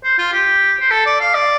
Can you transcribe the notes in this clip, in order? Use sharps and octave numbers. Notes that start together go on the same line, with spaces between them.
C5
F4
G4
C5
A4
D5
F5
D5